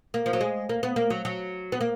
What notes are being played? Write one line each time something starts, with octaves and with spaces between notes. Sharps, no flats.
A#3
F3
F#3
G#3
A#3
B3
A#3
F#3
F#3
B3
A#3